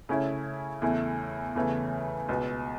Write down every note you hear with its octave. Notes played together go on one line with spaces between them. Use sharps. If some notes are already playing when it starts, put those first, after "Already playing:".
C#3 A3 C#4 E4
E2 C#3 A3 E4
E2 C#3 E3 A3
C#2 B2 B3